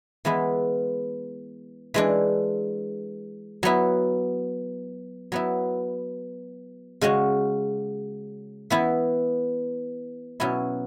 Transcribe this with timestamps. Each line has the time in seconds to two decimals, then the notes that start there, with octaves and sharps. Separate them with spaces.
0.25 E3 G#3 B3 E4
1.94 E3 G#3 D4
3.63 F#3 B3 E4
5.32 F#3 B3 E4
7.01 C#3 G#3 C#4 F#4
8.70 E3 B3 E4
10.40 B2 F#3 C#4 E4